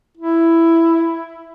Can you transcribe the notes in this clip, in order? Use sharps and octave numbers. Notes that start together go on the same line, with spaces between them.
E4